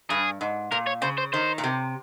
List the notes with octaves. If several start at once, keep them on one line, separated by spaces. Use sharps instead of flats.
G2 G#4
G#2
A#2 A#4
C#5
C#3 C5
C5
D#3 C5
A#2
C3